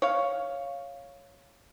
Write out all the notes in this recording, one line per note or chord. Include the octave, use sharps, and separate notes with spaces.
C#5 F5